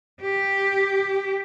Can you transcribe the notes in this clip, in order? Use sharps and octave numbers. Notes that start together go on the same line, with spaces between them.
G4